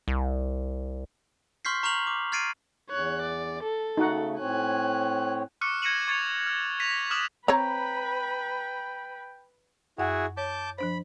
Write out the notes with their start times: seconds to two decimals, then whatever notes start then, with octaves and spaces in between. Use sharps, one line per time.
0.08 C2
1.65 C6 C#6 F6 G6 B6 C7
1.83 A#5 C#6 F6 G6 F7 F#7
2.07 D6
2.32 F6 G#6 A6 C7 D7 D#7
2.90 E2 C#5 F#6
3.22 D5
3.63 A4
3.97 C#3 A3 D#4 F#4 F#5
4.39 A2 C4 C#5 G#5 F#6
5.61 C#6 D6 F6 F#6 C#7 D#7
5.82 G#6 A#6 C#7 D#7 E7 F#7
6.08 C#6 G#6 A6 C#7 D#7 F7
6.46 F6
6.80 A#6 B6 D#7 F7
7.10 D6 D#6 F6 F#6 E7 F#7
7.48 C4 B4 C#5 G5 A#5 B5
9.98 F#2 E4 F#4 G#4 F#5
10.37 C#5 A5 D6 G6
10.78 F3 D4 C5 B5